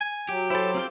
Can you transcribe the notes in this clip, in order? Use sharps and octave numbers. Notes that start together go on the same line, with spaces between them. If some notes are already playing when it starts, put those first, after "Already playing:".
G#5
F#3 G4
E4 A4 C5
C4 F4 G5